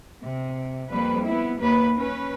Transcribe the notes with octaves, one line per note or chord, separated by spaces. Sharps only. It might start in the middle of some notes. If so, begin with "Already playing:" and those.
C3
F2 G3 A#3 B4
B3 E4
D#2 A#3 B4
C#4 B4